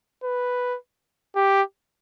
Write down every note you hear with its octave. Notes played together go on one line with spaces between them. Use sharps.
B4
G4